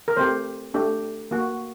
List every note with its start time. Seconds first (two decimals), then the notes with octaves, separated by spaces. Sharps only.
0.08 A#4
0.17 A3 C4 G4 C5
0.74 A3 D4 G4
1.31 A#3 F#4